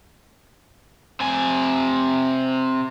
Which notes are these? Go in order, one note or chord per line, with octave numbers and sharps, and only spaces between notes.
C3 G#5